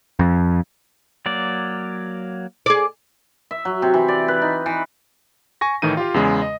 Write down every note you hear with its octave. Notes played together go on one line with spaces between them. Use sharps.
F2
F#3 A#3 D5
G#4 D5
E5
F#3
C3
E3
D5
B4
D#4
E3
G#5 C#6 A#6
A2 D#3 E3 D#4 D#7
F4 G4 F5
E2 C#3 G#3 G#4
D#5